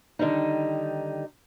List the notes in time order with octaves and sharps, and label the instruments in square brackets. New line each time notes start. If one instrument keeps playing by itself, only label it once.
[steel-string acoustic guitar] D3 D#3 G3 D#4